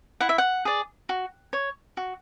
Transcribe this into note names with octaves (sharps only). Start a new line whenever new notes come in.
E4 F#5
E5
F#5
G#4 D5
F#4
C#5
F#4